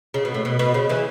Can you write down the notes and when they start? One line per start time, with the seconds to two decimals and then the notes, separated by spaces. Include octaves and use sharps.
0.14 C#3
0.25 B2
0.34 A2
0.45 B2
0.59 B2
0.74 C#3
0.89 C#3 E3